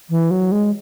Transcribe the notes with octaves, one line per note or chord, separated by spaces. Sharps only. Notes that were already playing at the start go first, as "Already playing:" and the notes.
E3
F#3
G#3